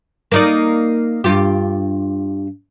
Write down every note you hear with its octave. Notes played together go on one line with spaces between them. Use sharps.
A#3 D#4 D5
G2 F4 G4